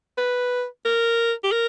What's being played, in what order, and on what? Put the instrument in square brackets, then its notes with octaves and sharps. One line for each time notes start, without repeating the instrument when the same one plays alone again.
[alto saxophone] B4
A#4
G4
A#4